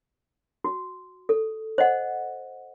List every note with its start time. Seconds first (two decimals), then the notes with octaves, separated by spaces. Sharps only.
0.64 F#4
1.29 A4
1.78 C5 D#5 F#5